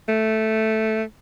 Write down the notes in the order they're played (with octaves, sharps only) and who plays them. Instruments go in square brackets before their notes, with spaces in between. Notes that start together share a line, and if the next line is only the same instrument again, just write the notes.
[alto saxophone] A3